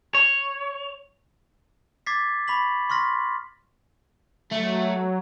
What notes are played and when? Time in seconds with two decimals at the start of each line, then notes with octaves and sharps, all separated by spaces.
0.15 C#5
2.06 D6 G#6 A6 B6 C7
2.48 B5 C#6 B6 F#7
2.90 C6 C#6 F6 A#6 B6
4.52 F#3 A3